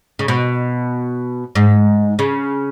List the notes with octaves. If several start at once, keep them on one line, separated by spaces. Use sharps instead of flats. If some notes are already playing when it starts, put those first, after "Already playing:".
C#3
B2
G#2
C#3